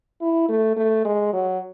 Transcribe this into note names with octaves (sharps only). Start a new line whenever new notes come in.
E4
A3
A3
G#3
F#3